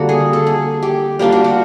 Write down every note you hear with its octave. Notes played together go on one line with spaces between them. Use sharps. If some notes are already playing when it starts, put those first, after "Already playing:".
Already playing: D3 G3 A#3 F#4
G#4
A4
G#4
G4
G3 A#3 D4 F4 G4
F#4
F#4